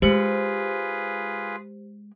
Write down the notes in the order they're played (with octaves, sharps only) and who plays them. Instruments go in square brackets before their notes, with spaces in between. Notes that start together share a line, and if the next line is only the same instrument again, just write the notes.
[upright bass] G#3 [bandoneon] F4 G#4 B4 [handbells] G4 C5